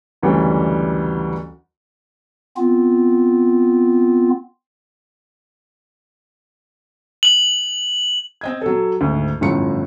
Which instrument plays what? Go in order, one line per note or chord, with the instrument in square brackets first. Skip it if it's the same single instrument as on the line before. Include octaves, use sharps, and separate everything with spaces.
[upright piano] F#1 D2 E3 G3 D4 C#5
[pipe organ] B3 C4 F4
[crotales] F#7
[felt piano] C4 D#5 G#6
F#3 A4
D2 G#2 D#3
G1 F#2 A2 F3 C#7